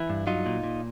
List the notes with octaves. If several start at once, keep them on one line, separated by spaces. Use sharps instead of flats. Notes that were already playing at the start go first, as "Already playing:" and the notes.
Already playing: E3 E4
G2
F#3 D#4 F4
A#2
A#2